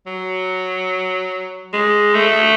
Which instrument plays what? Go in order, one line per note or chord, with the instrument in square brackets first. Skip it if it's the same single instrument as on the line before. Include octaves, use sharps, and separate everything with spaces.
[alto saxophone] F#3
G#3
A3